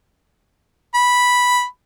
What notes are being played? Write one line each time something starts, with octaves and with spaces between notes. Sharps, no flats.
B5